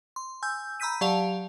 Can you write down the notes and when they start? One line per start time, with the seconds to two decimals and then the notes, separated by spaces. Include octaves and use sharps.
0.16 C6
0.42 G#5 E6 G6
0.80 A#5 B5 E6 G6 B6 D#7
1.01 F#3 G4 D5 F5 A5 F7